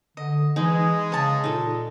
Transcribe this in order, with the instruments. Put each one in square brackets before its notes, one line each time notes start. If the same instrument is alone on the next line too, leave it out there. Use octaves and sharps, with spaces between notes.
[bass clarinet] D3 [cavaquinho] D#5
[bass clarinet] E3 [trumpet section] G#3 D#5 [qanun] D#4 [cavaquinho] G#4
[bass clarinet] C#3 [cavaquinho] C#5 A5
[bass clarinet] A#2 [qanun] D#4 A4